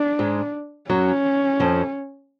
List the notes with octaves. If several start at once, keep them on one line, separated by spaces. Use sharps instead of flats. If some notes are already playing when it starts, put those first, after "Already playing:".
Already playing: D4
G#2 G#3
F#2 F#3 C#4
F2 F3